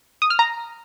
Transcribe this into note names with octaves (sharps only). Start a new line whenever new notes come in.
D#6
F6
A#5